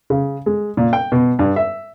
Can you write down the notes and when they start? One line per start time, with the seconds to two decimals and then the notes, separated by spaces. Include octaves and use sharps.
0.10 C#3
0.46 G#3
0.77 A#2
0.93 G5
1.12 B2
1.39 G2
1.56 E5